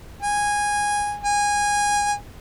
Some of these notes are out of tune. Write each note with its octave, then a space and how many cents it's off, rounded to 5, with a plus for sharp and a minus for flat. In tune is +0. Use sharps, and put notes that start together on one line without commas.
G#5 -10
G#5 -15